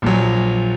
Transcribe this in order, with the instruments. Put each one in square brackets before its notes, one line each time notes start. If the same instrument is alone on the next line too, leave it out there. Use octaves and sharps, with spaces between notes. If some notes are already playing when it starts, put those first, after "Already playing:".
[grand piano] A#1 A#2 F#3